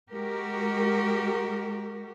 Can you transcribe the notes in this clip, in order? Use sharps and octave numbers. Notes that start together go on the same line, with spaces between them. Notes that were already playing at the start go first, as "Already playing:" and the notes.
G#3 F#4 G4 A#4